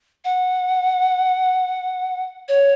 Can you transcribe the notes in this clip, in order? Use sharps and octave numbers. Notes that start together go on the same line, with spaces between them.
F#5
C#5